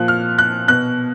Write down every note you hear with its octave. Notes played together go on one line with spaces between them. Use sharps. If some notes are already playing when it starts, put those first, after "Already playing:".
Already playing: A#2 F3 F#6
F6
F#6
B2 F#6